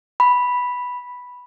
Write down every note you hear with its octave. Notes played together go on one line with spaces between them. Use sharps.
B5